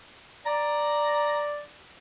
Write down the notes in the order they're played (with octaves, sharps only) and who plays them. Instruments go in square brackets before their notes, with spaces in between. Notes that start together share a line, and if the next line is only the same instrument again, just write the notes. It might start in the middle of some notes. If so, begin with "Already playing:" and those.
[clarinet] D5 [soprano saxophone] A#5